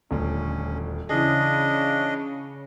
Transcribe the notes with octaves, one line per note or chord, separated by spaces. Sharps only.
D#1 D2 C#4
C#3 E3 D4 E4 G#4 D#5